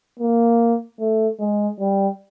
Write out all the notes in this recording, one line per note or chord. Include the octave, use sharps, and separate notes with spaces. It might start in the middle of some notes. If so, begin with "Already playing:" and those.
A#3
A3
G#3
G3